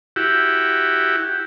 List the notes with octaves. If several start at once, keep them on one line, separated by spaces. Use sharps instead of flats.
E4 F#4 G4